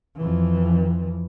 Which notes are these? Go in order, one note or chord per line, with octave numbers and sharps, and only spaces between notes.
F2 E3